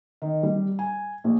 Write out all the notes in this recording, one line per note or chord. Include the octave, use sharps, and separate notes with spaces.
D#3
G3
G#5
A#1